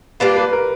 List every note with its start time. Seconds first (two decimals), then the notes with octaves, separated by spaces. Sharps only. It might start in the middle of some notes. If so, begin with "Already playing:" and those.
0.20 G3 A#3 D4 F4 B4
0.36 B4
0.53 A#4